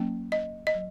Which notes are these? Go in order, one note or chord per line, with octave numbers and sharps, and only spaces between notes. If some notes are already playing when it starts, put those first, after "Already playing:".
Already playing: F#3 A#3 C#4
D#5
D#5
F#3